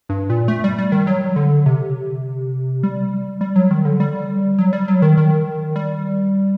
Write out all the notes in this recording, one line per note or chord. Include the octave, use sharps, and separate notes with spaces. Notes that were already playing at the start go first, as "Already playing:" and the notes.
G2
A#2
A3
G3
G3
D#3
F#3
D3
C3
G3
G3
F#3
D#3
D3
G3
F#3
G3
F#3
D#3
D#3
G3